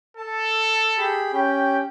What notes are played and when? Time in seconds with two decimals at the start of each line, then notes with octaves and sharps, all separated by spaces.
0.17 A4 A5
0.98 G4 G#4 B5
1.33 C#4 G4 G5